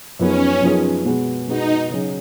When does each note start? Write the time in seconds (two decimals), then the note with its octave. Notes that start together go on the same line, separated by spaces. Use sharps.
0.19 F#2 F3 B3 C#4 D#4 G#4
0.62 F#2 F3 B3 D#4 G#4
1.05 B2 G#3 B3 F#4
1.48 B2 G#3 B3 D#4 F#4
1.90 C#3 F#3 C#4 G#4